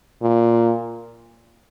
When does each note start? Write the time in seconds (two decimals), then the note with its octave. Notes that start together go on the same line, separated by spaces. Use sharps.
0.22 A#2